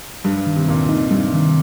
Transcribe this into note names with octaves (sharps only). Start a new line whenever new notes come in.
G2 G3
D#3
C3
D#2 A#2
D#4
G2 C3 G3
D#3